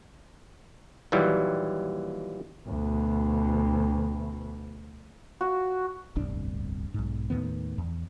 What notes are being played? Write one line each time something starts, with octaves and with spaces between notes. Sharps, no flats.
D#2 A#2 E3 F#3 G3
D2 B2
F#4
D1 G1 C2 D4
B1 G#2
D#2 A2 D#3 B3
E2